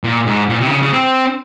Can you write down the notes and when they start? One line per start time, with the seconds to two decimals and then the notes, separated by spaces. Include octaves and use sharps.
0.04 A#2
0.26 G#2
0.49 A#2
0.60 C3
0.67 D#3
0.70 C#3
0.82 C#3
0.93 C4